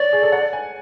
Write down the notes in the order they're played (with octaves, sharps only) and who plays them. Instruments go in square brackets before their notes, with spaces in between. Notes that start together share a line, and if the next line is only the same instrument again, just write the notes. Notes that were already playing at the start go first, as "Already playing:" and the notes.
Already playing: [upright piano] C#5 [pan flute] D5
[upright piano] G#4
A4
F#5
G#5